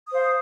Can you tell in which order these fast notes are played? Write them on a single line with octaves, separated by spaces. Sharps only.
D#6 C5 F5